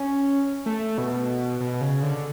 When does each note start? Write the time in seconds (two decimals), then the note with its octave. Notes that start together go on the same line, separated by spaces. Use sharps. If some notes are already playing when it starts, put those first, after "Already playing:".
Already playing: C#4
0.66 A3
0.98 B2
1.60 B2
1.81 C#3
2.02 D3